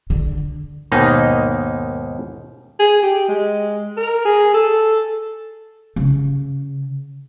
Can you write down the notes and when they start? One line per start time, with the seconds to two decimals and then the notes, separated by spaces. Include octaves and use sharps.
0.10 D3
0.92 D#2 G#2 B2 A#3 D#4
2.79 G#4
3.03 G4
3.28 G#3
3.97 A#4
4.25 G#4
4.54 A4
5.96 C#3